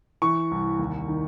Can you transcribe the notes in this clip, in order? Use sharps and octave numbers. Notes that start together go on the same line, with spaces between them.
E3 C#6
C2
D#2
D#3